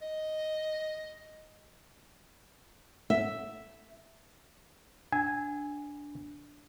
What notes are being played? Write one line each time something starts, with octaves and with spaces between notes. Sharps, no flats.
D#5
E5
D4 G#5